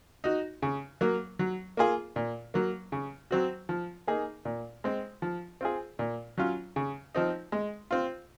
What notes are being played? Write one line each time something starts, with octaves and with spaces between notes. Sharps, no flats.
D#4 F#4
C#3
F#3 A#3
F#3
A#3 F4 G#4
A#2
F#3 A#3
C#3
F#3 C4 F#4
F3
A#3 D#4 G#4
A#2
G#3 C4
F3
C4 F4 G#4
A#2
F#3 C#4 F4
C#3
F3 C4 D#4
G#3
C4 F4